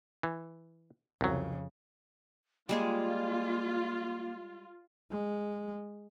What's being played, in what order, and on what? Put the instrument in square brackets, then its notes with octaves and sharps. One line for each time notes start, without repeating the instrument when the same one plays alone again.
[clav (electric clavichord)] E3
[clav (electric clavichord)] C2 F#3 [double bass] F2 C#3
[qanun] G3 G#3 G#4 [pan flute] A#3 [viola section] F4
[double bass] G#3